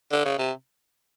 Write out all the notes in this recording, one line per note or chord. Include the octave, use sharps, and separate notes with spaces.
D3
C#3
C3